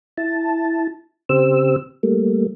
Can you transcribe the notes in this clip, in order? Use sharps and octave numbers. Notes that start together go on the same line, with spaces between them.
E4 A5
C#3 C4 G4 C5 E6
G3 A3 A#3